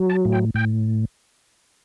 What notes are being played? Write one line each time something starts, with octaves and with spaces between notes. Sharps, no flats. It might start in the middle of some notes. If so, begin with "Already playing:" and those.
Already playing: F#3
A5
A2
G5
A2 G5